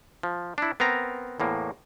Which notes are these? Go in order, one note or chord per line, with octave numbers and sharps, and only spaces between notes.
F3
D4 E4
B3 C4 A#4 A#5
E2 A2 A#3